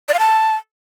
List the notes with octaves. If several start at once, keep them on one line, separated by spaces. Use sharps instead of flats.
D5
F5
A5